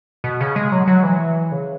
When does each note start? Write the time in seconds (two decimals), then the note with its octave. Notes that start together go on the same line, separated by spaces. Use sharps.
0.24 B2
0.41 C#3
0.56 G#3
0.72 F#3
0.88 F#3
1.03 E3
1.52 C#3